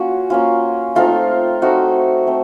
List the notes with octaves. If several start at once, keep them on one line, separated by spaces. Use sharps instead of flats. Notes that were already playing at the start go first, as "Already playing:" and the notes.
Already playing: A#3 C#4 F4 F#4
A#3 C#4 F4
A3 C4 D#4 F4
A3 C4 D#4 F#4
A3 C4